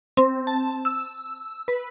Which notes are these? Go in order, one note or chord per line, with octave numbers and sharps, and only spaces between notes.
C4
A5
E6
B4